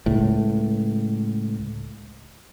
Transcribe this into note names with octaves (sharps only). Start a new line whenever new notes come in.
C#2 A2